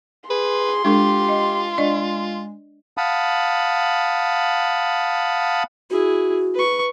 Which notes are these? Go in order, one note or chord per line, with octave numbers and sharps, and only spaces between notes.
G#4 B4 C6
G#3 D4 F4 G4 A4
D#5
G#3 D4 D5 D#5
F5 F#5 A5 B5 D#6
E4 F#4 G#4
B4 C#6